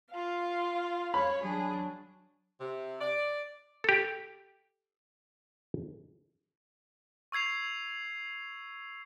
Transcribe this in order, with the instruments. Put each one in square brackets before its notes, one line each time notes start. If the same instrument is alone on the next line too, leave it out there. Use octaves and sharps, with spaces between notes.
[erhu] F4 [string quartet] F5
[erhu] C#5 [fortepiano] B5
[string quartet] F#3 D4 [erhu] G#4
[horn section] C3
D5
[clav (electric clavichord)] G4 A4
[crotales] C#6 E6 G#6 C7 F7